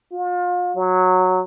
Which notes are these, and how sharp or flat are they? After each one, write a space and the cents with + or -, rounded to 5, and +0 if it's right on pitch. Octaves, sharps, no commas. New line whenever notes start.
F4 +35
F#3 -10